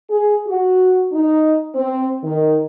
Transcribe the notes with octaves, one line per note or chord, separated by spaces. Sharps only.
G#4
F#4
D#4
C4
D#3